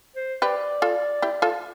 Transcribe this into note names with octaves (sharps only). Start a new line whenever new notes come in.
C5
G4 B4 D5
F4 A4
E4 G4
F4 A4